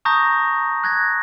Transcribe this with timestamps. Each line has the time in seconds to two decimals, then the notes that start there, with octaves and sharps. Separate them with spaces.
0.05 A5 A#5 C#6 D#6 G6 A#6
0.84 F#6 G#6 A#6